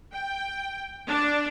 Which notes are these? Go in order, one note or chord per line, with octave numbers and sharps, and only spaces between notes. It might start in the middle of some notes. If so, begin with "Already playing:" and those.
G5
D4